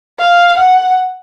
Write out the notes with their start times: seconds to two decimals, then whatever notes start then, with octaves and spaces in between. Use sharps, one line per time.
0.19 F5
0.58 F#5